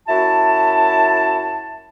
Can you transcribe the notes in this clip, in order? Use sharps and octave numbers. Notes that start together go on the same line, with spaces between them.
F#2 E4 F#4 A5